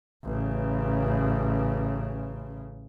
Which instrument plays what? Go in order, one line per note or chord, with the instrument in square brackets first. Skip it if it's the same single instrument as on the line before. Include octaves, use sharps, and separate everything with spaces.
[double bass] A1 C#3